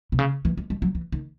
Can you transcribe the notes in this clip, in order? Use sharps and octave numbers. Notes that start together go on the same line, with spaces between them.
B2
C#3
E3
G#3
G#3
F#3
E3
D#3